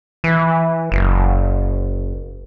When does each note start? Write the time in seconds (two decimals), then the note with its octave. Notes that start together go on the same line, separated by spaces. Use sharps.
0.24 E3
0.92 F#1